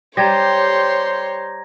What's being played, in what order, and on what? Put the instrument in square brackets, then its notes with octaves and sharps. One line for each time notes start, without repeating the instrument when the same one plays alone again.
[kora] G3 [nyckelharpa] G4 C5 [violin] C#5 C6 [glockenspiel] A#5 G#6 A#6